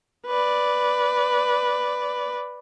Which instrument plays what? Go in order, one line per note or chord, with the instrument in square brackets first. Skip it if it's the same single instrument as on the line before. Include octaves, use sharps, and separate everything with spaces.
[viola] B4 D5